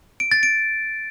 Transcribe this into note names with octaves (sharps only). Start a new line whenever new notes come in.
D7
A6
D7